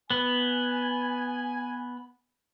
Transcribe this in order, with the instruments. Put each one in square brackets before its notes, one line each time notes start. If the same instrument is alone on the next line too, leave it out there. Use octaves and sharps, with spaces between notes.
[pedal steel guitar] B3 [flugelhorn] G#5